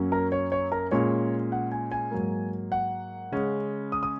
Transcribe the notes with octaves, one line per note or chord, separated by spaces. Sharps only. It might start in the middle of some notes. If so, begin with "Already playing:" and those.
Already playing: F#2 F#3 A#3 C#4
A#4
C#5
C#5
A#4
A#2 G#3 C#4 C#5
F#5
G#5
G#5
G#2 F#3 A#3
F#5
C#3 G#3 C#4
D#6
D#6